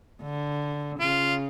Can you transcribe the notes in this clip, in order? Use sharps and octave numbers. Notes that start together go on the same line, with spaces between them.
D3
C#3 F4